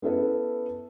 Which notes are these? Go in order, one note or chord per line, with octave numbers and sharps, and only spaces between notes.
B3 C#4 E4 A4 B4